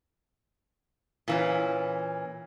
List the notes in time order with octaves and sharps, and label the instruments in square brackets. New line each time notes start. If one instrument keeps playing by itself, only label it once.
[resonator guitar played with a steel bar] A#2 E3 C#4